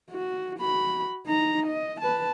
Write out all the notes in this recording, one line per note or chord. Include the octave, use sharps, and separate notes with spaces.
F#4
F#4 B5
D#4 A#5
D#5
B4 A5